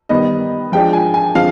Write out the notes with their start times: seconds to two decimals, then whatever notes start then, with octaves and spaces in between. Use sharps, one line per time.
0.09 D#3 G3 B3 D#5
0.72 F3 G#3 D4 G5
0.93 G#5
1.14 G#5
1.35 D3 F3 G#3 C4 F5